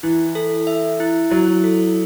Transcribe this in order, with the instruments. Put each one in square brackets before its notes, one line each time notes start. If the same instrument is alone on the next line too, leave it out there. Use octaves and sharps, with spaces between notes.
[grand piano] E3 [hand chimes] E4
[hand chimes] A4
E5
E4
[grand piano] F#3 [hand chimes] E4
[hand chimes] A4